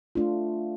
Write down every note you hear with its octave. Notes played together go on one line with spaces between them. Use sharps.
A3 D4 F4